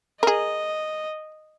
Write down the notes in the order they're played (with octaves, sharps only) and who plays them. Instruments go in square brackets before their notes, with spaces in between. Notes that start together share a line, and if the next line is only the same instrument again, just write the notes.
[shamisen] G#4 A#4 [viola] D#5